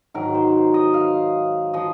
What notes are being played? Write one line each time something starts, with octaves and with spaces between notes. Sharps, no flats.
G#2 D#3 F#3 A#4
C5
D#5
F5
F3 D#5